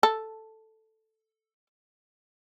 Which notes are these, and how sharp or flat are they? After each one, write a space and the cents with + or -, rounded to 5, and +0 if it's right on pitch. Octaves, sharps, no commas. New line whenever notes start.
A4 +0